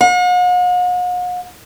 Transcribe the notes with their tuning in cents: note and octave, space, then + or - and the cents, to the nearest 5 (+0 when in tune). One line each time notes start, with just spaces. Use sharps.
F#5 -45